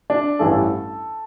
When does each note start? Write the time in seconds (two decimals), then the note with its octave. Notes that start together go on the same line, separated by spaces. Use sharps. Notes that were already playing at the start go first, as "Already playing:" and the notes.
0.10 D4
0.39 A1 G2 E3 A4